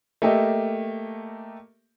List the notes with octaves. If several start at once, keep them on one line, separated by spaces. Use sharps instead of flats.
A3 A#3 G4 A4 D#5 E5